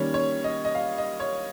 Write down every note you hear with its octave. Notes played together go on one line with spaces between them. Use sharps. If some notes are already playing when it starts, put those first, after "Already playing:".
Already playing: D#3 G3 A#3 C#4 C#5
C#5
D#5
D#5
F5
D#5
C#5